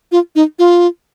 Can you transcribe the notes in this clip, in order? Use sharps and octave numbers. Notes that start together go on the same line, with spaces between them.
F4
D#4
F4